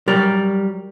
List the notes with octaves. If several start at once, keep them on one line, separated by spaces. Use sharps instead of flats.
F#3 G3 A#4 D5